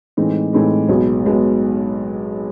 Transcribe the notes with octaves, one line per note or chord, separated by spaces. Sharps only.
A2 E3 G#3 C4 D#4
A2 E3 G#3 C4 D#4
B1 B2 G#3 B3
B2 G#3 B3